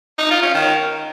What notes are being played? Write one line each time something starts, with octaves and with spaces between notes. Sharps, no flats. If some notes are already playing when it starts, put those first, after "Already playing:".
D#4
F4
C#4
D#3